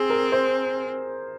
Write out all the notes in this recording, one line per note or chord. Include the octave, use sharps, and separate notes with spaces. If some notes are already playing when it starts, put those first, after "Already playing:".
Already playing: C4 G#4
A#4
C5